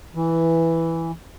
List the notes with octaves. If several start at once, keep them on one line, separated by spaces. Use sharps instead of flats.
E3